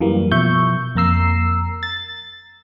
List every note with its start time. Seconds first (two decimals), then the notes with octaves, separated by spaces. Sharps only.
0.01 F#2 E3 G3 A#3
0.32 B2 F3 E5 C#6 G6
0.96 F2 A#3 A#5 E6 C7
1.83 A6